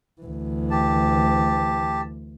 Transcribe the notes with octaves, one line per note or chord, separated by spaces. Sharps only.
D2 E3
G4 A5